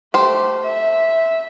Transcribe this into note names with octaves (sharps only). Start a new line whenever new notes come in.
A3 G4 C5
E5